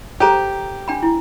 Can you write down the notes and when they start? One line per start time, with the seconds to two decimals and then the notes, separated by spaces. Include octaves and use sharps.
0.20 G4 A4 C5 A#5
0.88 D4 G5 B5
1.03 E4